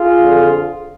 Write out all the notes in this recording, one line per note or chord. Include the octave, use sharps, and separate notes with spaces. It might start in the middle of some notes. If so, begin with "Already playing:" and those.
Already playing: F4 G#4
F2 D3 F3